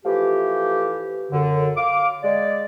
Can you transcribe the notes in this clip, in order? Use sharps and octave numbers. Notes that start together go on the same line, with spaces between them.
E3 F3 A3 F4 G4
F#2 D3
F5 D6
G#3 D5